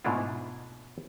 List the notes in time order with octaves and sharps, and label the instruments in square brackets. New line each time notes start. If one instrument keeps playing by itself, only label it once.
[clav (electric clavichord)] G#2 B2 A3 D4 E4 F4